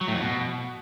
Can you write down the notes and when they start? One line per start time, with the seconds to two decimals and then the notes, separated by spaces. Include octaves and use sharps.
0.01 F#3
0.07 A2
0.14 F2
0.21 B2